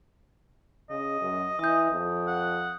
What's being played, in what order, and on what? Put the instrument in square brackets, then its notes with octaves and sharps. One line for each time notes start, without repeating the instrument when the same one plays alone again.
[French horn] C#3 [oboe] D#5
[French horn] F#2
[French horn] E3 [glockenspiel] D#6 G6
[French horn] F2
[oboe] F#5